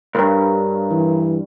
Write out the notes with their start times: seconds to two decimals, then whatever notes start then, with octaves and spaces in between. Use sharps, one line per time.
0.15 C#2 G2 A#4 C#5 A#5
0.92 E3